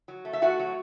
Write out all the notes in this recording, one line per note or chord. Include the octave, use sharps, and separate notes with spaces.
F#3
A3
E5
A3 F#4 F#5
F#3